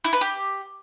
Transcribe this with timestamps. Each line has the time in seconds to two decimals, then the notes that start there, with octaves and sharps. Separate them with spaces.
0.04 E4
0.13 B4
0.21 G4